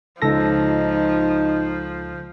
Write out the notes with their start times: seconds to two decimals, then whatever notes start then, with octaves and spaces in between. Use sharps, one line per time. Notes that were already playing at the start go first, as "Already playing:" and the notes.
0.22 C#2 F3 D#4 A4 A#6